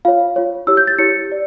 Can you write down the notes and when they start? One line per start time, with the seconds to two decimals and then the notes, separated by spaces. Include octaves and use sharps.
0.05 F4 C#5 F5
0.36 F4 C#5
0.67 E4 G4 C#5 E6
0.77 G6
0.87 A6
0.98 E4 G4 C#5 C#7
1.29 G4 D5